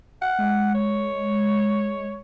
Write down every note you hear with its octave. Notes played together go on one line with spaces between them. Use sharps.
F#5
G#3
C#5